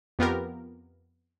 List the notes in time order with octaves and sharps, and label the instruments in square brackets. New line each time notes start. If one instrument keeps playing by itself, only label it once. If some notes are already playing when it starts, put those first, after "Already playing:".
[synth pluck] F2 B3 F4 G4 A#4